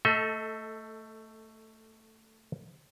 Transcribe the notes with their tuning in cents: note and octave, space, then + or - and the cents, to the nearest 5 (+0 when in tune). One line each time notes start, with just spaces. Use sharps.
A3 +15 A4 +0 D#5 +40